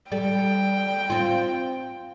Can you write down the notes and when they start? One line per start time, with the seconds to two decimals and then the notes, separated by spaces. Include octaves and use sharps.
0.12 G3 A4 G5
1.10 C4 F4